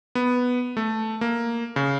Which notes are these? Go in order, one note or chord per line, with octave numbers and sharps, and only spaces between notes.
B3
A3
A#3
C#3